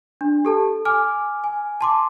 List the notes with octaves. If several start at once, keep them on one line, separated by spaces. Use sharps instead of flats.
D4
G4 A4 A5
G#5 D6 F6
G#5
A5 C6 D6